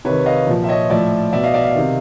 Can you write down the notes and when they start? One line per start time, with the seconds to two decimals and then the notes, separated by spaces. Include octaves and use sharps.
0.05 C3 D#3 B4 C#5
0.26 D#5 F5
0.47 A#2 F3
0.64 E5
0.69 C#5 D#5
0.90 A2 F3 D5 E5
1.33 B2 D5 E5
1.44 D#5 F5
1.54 D5 E5
1.65 D#5 F5
1.75 C3 D#3